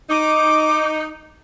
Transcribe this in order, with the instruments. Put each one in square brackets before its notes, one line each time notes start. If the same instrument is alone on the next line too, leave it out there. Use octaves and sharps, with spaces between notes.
[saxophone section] D#4 [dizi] D6